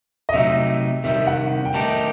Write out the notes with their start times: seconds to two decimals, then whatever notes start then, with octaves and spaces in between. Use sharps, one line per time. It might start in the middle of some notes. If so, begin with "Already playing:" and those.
0.29 D#5
0.34 C3 F#3 A3 D#4 E5
1.04 C3 D#3 G3 E5
1.27 F#5
1.65 G5
1.74 D#3 A3 D#4 G4 A5